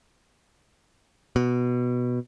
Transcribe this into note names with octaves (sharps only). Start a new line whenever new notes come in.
B2